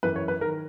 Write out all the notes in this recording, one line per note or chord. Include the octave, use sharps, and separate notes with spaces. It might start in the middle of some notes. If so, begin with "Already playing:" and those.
F#2 E3 B4
C#5
B4
D#3 A#4